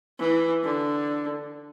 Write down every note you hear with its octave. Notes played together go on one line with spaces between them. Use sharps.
E3
D3